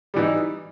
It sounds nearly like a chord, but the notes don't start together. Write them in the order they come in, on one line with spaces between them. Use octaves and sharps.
G3 E3 D#4